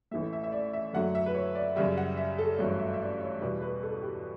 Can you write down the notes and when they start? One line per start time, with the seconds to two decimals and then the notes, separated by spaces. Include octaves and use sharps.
0.11 A1 A2 E3 A3 E5
0.33 E5
0.44 E5
0.52 D5
0.73 E5
0.93 F#2 D3 F#3 A3 F#5
1.15 E5
1.26 B4
1.35 C#5
1.55 D5
1.76 F#2 C#3 G3 E5
1.97 F#5
2.17 E5
2.38 A4
2.58 A1 G2 F#3 A3 C#5
2.79 E5
2.94 E5
3.00 D5
3.21 C#5
3.41 E2 B2 G3 B4
3.62 B4
3.83 A4
4.03 G4